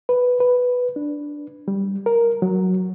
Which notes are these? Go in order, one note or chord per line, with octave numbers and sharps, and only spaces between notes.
B4
B4
D4
G3
A#4
F#3